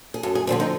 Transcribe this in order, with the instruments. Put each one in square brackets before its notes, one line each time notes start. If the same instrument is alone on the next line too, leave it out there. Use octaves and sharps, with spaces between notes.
[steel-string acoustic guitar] G#4
F#2 A4
G#4
D3 F3 A3 C4 D4
D#4